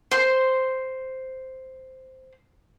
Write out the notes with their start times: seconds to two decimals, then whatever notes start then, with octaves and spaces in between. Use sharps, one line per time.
0.11 C5 C6